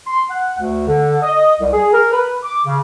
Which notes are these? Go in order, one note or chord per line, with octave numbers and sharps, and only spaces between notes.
C6
F#5
D2
D3
D#5
C2
G#4
A#4
B4
D6
C#3